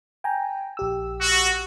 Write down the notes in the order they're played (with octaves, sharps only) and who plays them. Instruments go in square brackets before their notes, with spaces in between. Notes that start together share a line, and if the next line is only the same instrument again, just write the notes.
[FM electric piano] G5 G#5 A#5
A#1 G4 E6
[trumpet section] F#4